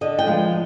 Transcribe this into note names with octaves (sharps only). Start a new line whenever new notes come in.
D3 D#5
G5
F3 G#3 B3